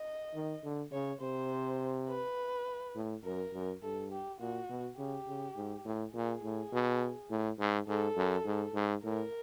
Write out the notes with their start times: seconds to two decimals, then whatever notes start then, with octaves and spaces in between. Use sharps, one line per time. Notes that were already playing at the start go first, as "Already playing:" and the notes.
Already playing: D#5
0.35 D#3
0.64 D3
0.92 C#3 C#5
1.21 C3 C5
2.09 B4
2.95 A2
3.24 F#2 A#4
3.53 F#2
3.82 G2 A4
4.12 G4
4.40 A#2 F#4
4.69 B2
4.98 C#3 G4
5.27 C#3
5.56 G#2
5.85 A2
6.14 A#2 G#4
6.43 A2
6.72 B2
7.30 A2
7.59 G#2
7.88 G#2 A4
8.17 F#2
8.46 G#2
8.74 G#2
9.04 A2 A#4